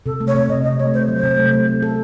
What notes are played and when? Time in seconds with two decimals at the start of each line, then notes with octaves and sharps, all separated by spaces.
0.06 C3 A4
0.20 A3
0.27 C#5
0.35 C3
0.49 C3 D#5
0.64 C3 D#5
0.78 A3 C#5
0.94 A3 C5
1.08 F#3
1.16 C5
1.24 C3
1.38 A3
1.53 A3
1.68 A3
1.82 A4